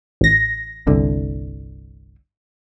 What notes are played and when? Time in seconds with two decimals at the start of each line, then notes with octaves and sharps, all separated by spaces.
0.21 A1 A#6
0.87 G1 C2 D3